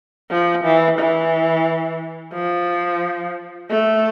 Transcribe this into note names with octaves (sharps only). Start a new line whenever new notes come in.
F3
E3
E3
F3
A3